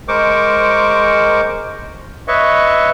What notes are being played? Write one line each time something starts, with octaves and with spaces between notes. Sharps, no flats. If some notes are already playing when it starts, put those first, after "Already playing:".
G#3 A#4 C5 C#6 D6
B4 C#5 D#5 E5 C#6